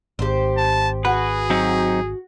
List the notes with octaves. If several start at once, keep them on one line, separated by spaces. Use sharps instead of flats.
G#1 G4 C5
A5
F#4 G#4 B4
F#3 C4 D#4